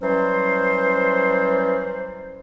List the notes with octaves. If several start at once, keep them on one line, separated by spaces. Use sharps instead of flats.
E3 F#3 G3 C#4 C5